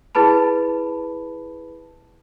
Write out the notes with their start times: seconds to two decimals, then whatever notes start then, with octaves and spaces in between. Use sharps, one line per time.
0.15 E4 G#4 B4 A5 B5